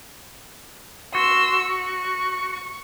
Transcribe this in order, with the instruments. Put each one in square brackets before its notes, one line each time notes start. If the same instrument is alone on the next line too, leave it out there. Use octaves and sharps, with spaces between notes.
[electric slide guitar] F#4 [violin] C6 E6
[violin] C#6